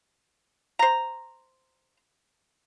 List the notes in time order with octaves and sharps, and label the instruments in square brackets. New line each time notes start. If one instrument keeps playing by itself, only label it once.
[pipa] C5 A#5